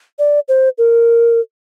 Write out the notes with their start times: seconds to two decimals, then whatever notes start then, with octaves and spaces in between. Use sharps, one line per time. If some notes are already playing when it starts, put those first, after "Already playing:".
0.19 D5
0.48 C5
0.78 A#4